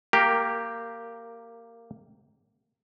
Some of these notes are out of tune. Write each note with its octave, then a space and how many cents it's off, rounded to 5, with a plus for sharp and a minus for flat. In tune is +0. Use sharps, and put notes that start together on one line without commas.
A#3 -15 G4 +0 A#4 +0